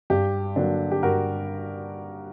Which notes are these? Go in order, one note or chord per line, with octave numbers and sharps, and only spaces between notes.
G2 G4
D3 F#3 A#3 D4
G4
G2 F#4 A#4